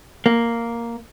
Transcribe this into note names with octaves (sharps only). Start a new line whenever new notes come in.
A#3